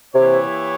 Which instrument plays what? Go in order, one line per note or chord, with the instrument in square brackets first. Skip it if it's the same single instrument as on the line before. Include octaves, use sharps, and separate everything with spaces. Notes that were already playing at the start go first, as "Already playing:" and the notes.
[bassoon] C3 [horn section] E3 A#3 E4 G4 C#5